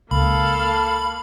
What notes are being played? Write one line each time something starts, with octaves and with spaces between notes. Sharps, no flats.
C#2 A#3 A4 F5 B5